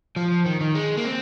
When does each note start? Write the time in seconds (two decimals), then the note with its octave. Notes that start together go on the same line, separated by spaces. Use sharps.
0.16 F3
0.46 D#3
0.61 D#3
0.75 G#3
0.98 A#3
1.05 C4